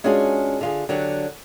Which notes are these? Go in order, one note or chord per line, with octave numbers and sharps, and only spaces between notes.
G#3 C#4 D4 F4 F#4 G#4
D3 F4 G#4
D3 F#3 G4 F#5